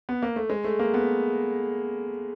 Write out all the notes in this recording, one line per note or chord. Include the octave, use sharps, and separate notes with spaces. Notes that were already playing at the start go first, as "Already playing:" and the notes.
B3
A#3
A3
G#3
A3
A#3
B3